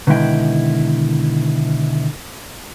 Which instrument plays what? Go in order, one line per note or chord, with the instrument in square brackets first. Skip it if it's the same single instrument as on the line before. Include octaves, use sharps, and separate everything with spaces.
[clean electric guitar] B2 D3 D#3 G#3 E4 G5